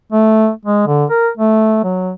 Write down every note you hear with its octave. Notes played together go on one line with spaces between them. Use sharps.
A3
G#3
D3
A#4
A3
F#3